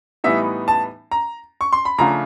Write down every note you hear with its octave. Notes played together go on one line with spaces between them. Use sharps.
A2 E3 G3 B3 D#4 E5
A5
A#5
C#6
C6
B5
C#3 F3 A3 D4 F4 A#5